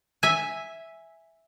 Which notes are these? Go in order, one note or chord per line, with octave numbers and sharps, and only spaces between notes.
E5 G#5